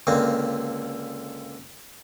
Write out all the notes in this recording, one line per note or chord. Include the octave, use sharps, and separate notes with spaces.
C#2 D3 A#3 C4